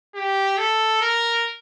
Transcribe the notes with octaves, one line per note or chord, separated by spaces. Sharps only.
G4
A4
A#4